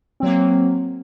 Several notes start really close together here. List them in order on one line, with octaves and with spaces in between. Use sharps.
C4 F#3 A#3